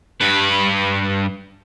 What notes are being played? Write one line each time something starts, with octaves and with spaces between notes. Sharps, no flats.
G2 B4